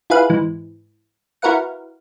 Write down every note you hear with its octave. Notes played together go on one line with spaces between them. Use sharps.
E4 F4 G#4 B4 F5 F#5
G#2 E3
E4 F#4 A#4 B4 F5 F#5